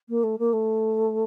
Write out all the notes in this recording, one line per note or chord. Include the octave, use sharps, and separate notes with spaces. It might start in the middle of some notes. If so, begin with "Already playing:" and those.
A#3
A3
A#3
A3